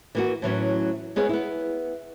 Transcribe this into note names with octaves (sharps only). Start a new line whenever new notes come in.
E3 A#3 F#4
A2 E3 F#3 C#4
G#3 B3 G#4 C#5
B3 E4